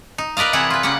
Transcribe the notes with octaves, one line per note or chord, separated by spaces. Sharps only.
D#4
A#4 B4 D5 D#5 F5
C3 E3 E4 G#4 F#5
F4 B4
C#3 G3 A#3 F#5